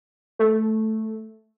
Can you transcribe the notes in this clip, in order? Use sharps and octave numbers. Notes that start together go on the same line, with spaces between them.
A3